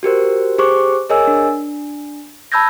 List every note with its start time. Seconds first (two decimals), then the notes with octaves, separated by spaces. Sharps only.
0.03 F#4 G4 A#4 C5
0.59 G4 G#4 C5 C#6 D6
1.09 G#4 A#4 C#5 D#5 G#5 E6
1.27 D4
2.52 A5 B5 E6 G6 G#6 A#6